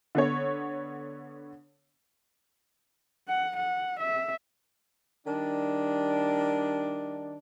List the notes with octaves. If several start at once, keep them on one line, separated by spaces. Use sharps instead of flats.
D3 B3 C#5
F#5
F#5
E5
D#3 G3 D4